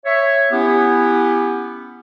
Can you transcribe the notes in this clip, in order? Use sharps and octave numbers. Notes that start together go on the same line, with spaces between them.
C#5 E5
B3 C#4 E4 G4